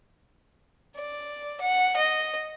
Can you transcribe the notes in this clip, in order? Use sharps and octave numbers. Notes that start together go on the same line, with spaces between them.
D5
F#5
D#5